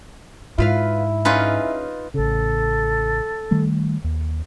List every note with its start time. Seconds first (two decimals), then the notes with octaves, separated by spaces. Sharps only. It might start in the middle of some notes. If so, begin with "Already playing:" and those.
0.58 G#2 E4 F4 B4 F5
1.25 C#4 D#4 F4 G#4 B4
2.14 A1 C#3 A4
3.51 D#3 G3 A3
4.04 D#2